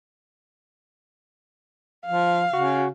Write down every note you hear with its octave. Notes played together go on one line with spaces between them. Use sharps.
F3 F5
C#3 F#4